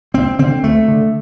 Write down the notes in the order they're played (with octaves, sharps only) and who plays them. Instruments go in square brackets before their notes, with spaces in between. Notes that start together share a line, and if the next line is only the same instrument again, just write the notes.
[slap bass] D2 C4
D3 C4
D2 A3
D3